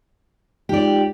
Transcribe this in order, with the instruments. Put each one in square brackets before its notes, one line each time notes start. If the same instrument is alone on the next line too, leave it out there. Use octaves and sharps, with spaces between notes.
[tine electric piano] G#3 D#4 F4 [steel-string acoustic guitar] G4 D5